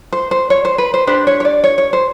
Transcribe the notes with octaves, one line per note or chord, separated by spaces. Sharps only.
C5
C5
C#5
C5
B4
C5
D4 G4 B4 C5
C#5
C#5
D5
C#5
C#5
C5